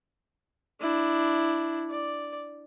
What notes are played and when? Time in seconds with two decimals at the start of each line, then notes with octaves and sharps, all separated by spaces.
0.80 D4 E4
1.90 D5